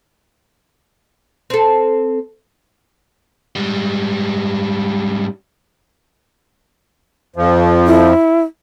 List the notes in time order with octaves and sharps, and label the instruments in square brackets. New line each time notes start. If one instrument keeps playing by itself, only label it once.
[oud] C4 A4
[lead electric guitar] G#2 G3
[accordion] F2 F3
[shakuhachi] E4